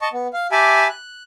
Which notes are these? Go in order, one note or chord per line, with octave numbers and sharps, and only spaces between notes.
D#5 A5 C#6
B3
F5
G4 E5 G#5 A5 B5 D6
F#6